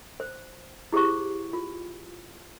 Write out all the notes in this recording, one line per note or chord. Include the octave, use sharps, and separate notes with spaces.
C5
E4 G4 G#4 C5 C#6
F4